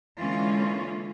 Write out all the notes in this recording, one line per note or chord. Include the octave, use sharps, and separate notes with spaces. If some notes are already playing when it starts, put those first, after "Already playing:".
D3 E3 G#3 A#3 C#4 F4